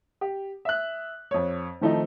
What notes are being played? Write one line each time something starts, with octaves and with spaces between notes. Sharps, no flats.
G4
E5 F#6
F2 C#5
D#3 F3 A3 C4 D#4